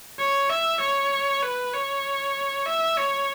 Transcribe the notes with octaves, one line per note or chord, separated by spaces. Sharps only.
C#5
E5
C#5
B4
C#5
E5
C#5